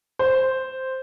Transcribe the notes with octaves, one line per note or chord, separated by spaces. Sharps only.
C5